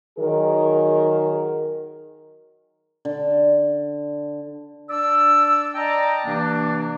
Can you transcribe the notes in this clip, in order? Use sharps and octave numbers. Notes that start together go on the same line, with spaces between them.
D#3 F#3 G#4 A#4
D3
D4 D5 E6
D5 D#5 G5 A5 A#5
C3 E3 A#3 D4